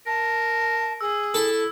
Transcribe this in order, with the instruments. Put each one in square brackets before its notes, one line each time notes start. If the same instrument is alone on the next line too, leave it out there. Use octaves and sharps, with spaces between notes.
[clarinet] A#4 [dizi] A5
[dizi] G#4 [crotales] E6
[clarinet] E4 [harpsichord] A4